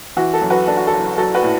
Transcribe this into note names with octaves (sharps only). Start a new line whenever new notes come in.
E3 F#4
A4
F#2
F#4 B4
D4 A4
F#4
A4
F#1
F#3 A4
F#4 B4
A2